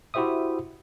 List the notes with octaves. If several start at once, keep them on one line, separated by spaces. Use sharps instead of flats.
E4 F#4 G4 C5 E5 D#6